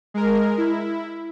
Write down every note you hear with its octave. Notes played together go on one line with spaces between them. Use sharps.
G#3 A#4
E4